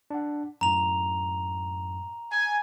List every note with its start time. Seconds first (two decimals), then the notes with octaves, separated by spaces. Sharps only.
0.10 D4 F#5
0.61 F#2 A2 A#5 F7
2.31 G#5